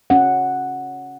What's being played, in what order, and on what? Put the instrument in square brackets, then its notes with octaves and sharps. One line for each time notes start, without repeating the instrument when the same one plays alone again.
[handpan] C#4 F#5